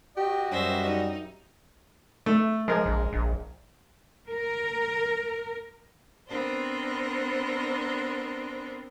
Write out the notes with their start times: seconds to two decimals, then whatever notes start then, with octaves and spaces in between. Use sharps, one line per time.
0.17 F#4 G4 D#5
0.51 F#2 G3 C#4 C5 E5
0.86 D#4
2.26 A3
2.68 F3 G#3 A#4
2.86 A#1
3.13 A#1
4.29 A#4
6.27 B3 C4 D4 A#4 C5